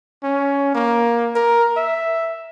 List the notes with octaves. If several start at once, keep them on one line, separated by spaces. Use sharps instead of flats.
C#4
A#3
A#4
E5